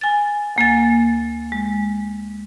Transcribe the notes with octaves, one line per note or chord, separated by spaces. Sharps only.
G#5 A6
D2 A#3 G#5 A6
G#3